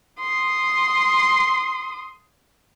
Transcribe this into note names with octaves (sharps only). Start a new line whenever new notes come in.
C6 D#6